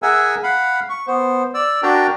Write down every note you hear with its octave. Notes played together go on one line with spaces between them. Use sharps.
G#4 A#4 E5 F#5 G#5 E6
F5 F#5 B5
C#6
B3 C5
D5 E6
D4 F#4 A#4 G5 A5 A#5